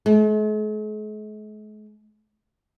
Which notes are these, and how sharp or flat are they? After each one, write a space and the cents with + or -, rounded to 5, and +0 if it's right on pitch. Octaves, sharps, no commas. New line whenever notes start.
G#3 +45